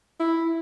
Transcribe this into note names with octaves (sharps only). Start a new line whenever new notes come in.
E4